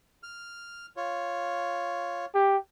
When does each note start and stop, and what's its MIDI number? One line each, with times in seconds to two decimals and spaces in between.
0.23 0.86 89
0.96 2.25 65
0.96 2.25 73
2.35 2.57 67